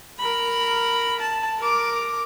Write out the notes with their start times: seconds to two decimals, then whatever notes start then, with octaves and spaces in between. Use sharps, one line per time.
0.19 A#4 B5
1.20 A5
1.60 A#4 D6